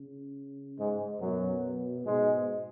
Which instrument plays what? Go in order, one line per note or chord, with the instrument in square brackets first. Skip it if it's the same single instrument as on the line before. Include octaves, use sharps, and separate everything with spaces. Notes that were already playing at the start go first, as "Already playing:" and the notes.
Already playing: [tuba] C#3
[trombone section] G#2 G#3
[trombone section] F#2 F#3 [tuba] B2
[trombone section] G#2 G#3 [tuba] B2